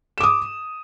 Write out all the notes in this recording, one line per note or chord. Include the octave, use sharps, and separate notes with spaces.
D6 D#6 E7